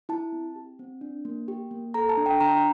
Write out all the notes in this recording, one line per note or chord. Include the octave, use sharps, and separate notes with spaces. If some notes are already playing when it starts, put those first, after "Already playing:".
E4 A5
C4
G4
C4
D4
A#3
G4
A#3
A4 A#5
A5
D4
G5
D4 A#5